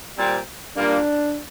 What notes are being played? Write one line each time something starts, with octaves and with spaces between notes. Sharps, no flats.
A#2 G3 C4
A#2 G3 A#3 D4